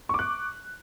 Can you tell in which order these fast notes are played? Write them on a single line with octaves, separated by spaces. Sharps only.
C#6 D6 F#6